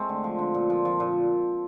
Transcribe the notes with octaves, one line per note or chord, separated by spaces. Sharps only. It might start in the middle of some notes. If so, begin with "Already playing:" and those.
Already playing: G#3 A3 C4
D3
F3
D3
A#2
F3
F3
A#2